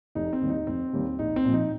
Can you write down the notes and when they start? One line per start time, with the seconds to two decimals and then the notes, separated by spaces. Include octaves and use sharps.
0.15 F1 D#4
0.33 C4
0.41 D#2 D#3 G3
0.50 D#4
0.67 F1 C4
0.93 D#2 D#3 G3
1.19 A#1 D#4
1.36 C4
1.45 A#2 F3
1.54 D#4